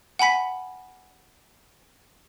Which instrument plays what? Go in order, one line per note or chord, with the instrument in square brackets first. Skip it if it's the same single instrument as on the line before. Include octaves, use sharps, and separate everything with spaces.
[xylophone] F#5 G#5 B5 B6